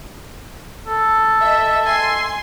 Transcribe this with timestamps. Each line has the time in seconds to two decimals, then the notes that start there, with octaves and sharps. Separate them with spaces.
0.87 A4
1.41 D#5 E5
1.86 G#5 C6 C7